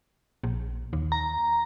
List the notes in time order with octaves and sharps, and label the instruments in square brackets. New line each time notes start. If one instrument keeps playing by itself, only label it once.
[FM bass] A#1
D#2
[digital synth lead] A#5